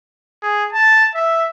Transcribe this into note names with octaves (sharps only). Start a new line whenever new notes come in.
G#4
A5
E5